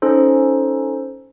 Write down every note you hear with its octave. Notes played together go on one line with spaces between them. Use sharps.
C#4 D#4 A4 C5